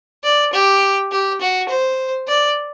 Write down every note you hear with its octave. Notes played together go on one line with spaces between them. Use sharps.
D5
G4
G4
F#4
C5
D5